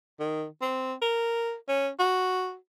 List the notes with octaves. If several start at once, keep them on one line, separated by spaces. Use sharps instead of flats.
D#3
C4
A#4
C#4
F#4